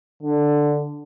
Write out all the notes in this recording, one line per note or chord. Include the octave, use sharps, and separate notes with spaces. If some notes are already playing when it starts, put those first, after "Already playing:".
D3